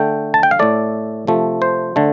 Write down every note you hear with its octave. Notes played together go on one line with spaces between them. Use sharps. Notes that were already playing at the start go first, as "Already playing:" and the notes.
Already playing: D3 A3 G5
A5
G5
F5
A2 A3 D5
C3 F3 A3
C5
D3 A3